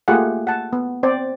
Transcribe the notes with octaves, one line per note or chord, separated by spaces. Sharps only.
A3 A#3 F4 G4 G#4 F#5
F#5 A5
B3
C4 C5 D5